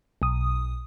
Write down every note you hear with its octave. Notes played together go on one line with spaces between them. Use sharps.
B1 D#6